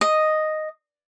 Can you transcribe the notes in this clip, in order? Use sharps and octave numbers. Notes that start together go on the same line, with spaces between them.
D#5